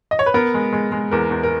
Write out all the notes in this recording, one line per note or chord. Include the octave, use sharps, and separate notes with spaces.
D#5
C#5
B4
B3 A#4
G#3
G#3
G#3
E2 A#4
E2
A#4